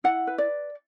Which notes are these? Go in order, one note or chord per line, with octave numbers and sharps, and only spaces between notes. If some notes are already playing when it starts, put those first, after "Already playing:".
E4 F#5
B4
D5